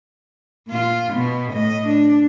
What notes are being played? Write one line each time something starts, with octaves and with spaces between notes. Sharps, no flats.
A#2 F4
B2 B3
A2 D#5
D4